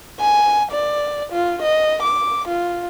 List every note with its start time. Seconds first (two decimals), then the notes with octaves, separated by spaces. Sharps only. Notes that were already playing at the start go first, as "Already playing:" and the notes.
0.20 G#5
0.71 D5
1.32 F4
1.63 D#5
2.02 D6
2.48 F4